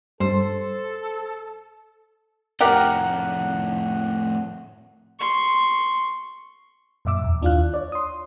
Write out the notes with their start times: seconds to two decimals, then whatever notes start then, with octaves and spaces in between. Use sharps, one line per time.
0.20 G2 A4 C5
2.61 F2 A2 G4 A#4 F#5
5.20 C6 C#6
7.05 F#2 A#2 E5 D6 E6
7.24 E2
7.42 D#2 D4 E4 F4 F5 F#6
7.74 C#5 D5
7.92 C6 D#6